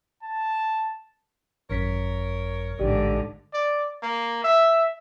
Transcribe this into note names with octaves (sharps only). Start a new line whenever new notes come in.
A5
G#1 F#2 A#4 C#5 B6
A1 G#2 D3 G4 D5
D5
A#3
E5